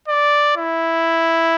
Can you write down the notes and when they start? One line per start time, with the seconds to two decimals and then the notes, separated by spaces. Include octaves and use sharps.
0.08 D5
0.57 E4